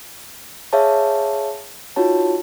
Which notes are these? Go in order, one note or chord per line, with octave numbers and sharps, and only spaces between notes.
G#4 C#5 E5 F5 A5
D#4 F4 F#4 C#5 A5